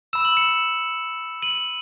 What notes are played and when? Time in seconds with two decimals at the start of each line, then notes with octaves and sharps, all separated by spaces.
0.13 B5 E6 E7
0.25 F#7
0.37 C#7 E7
1.42 D#7 F#7